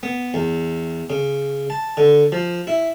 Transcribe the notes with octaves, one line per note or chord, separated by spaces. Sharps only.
B3
E2
C#3
A5
D3
F3
E4